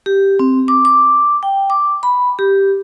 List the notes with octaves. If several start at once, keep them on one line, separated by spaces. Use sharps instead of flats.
G4
C4
D6
D6
G5
D6
B5
G4